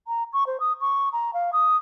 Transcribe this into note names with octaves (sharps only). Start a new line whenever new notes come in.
A#5
C#6
C5
D#6
C#6
A#5
F5
D#6